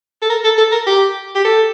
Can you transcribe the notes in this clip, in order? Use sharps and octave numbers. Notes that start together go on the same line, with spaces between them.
A4
A#4
A4
A4
A#4
G4
G4
A4